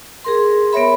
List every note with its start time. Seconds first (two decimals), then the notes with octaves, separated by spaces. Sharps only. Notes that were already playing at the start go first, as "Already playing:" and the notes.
0.24 G#4 A#4 C6
0.73 B3 A#4 C#5 E5 B5